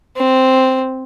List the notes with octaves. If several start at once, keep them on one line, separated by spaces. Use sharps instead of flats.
C4